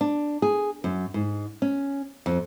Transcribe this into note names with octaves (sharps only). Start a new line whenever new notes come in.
D4
G#4
F#2
G#2
C#4
F2